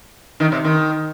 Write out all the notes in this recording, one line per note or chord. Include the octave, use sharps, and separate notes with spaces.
D#3
C3
D#3